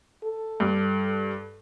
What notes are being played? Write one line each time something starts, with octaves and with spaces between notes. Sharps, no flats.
A4
G2